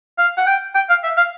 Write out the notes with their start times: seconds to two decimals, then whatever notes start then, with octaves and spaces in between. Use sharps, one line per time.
0.19 F5
0.38 F#5
0.47 G5
0.75 G5
0.90 F5
1.04 E5
1.17 F5